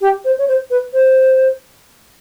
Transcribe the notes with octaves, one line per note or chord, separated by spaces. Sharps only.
G4
C5
C#5
C5
B4
C5